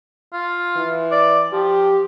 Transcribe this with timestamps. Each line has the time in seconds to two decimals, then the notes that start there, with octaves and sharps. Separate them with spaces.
0.33 F4
0.76 E3
1.12 D5
1.53 F3 G4